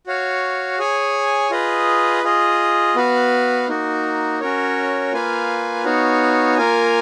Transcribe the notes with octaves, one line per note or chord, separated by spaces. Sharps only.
F#4 C#5 F5
G#4 C#5 G#5
F4 G#4 B4 D#5
F4 G#4 D#5
B3 F#4 B4 F5
A#3 D#4 F#4
C#4 F#4 A#4 C#5
A#3 F4 B4 F5 G#5
B3 D#4 F#4 C#5 F5
A#3 F4 A#4 F5 G#5